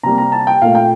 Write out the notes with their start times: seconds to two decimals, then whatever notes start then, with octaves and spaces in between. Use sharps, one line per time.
0.03 C3 G3 A#3 A#5
0.18 A#5
0.32 A5
0.47 G5
0.61 A#2 A3 F5
0.75 G5